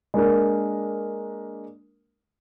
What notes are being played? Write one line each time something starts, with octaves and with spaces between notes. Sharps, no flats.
G#3 A#3 D4 A#4